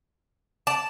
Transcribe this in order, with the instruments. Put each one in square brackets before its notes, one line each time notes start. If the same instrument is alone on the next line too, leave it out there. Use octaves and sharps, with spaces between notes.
[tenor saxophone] D5 [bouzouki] A5